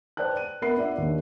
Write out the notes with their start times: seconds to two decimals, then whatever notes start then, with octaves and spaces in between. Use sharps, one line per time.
0.17 B4 C5 D5 G5 A5 F#6
0.37 D#7
0.62 B3 A#4 B4 E5 B5 C7
0.77 D4 F4 D5 E5 F#5
0.98 D#2 D4 G4